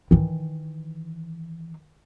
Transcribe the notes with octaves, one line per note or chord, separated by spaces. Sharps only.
D#3 E3